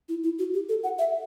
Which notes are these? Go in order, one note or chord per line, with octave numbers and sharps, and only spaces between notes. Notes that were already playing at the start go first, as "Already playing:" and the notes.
E4
E4
F#4
G4
A4
F#5
E5